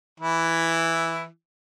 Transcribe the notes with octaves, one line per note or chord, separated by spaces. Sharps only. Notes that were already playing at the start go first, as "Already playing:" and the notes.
E3 E4